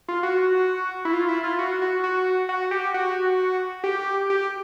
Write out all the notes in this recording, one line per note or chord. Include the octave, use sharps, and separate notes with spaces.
F4
F#4
E4
F4
E4
F4
F#4
F#4
F#4
F#4
G4
F#4
G4
G4